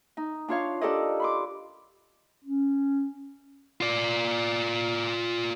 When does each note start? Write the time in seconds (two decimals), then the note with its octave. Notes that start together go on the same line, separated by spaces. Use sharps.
0.17 D#4
0.48 D4 F4 C#5 F5
0.81 D4 G4 A4 A#4 D5 D#5
1.20 B5 C6 D6
2.44 C#4
3.81 F4 D5